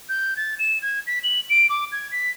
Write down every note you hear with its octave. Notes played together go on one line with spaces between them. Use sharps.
G6
A6
E7
G#6
B6
F#7
D7
D6
G#6
B6